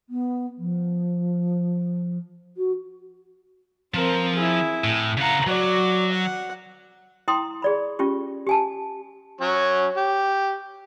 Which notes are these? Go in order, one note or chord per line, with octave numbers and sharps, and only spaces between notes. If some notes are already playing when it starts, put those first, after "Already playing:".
B3
F3
F#4
F3 C4 A#4
E4 G#4
A2
C#3 F5 F#5 A#5
F#3 F#4 D5
F#5
E4 G5 A#5 C6 D#6
G#4 D5 B5
C#4 F4 G4 C#6
G4 G#5 A5
F#3 C#4 C#5
G4